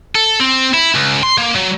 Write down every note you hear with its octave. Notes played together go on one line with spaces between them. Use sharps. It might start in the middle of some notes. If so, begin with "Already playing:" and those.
A4
C4
E4
C#2
C6
A#3
F#3